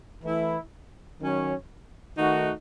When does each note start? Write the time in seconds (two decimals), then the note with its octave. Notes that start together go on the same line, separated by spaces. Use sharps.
0.23 E3 A3 E4
1.21 D#3 F#3 C#4
2.18 D#3 A3 D#4 F#4